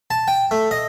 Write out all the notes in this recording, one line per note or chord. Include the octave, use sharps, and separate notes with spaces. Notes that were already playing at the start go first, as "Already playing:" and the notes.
A5
G5
A3
D#5